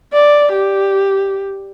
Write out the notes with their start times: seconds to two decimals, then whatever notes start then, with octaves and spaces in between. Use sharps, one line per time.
0.13 D5
0.52 G4